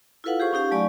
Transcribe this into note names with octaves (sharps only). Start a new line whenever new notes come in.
E4 F4 A4 B4 F5 F#5
G4 G#4 C5 C#6
C#4 D#4 G4 F5
F#3 A3 D5 G#5 C#6